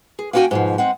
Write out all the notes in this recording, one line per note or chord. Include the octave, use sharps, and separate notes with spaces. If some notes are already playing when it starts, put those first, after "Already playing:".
G#4
A#3 B3 C#4 F#4 G5 G#5
G#2 B2 F3
G#3 C4 F#5